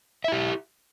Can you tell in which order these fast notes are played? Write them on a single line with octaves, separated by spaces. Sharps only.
E5 E4 G4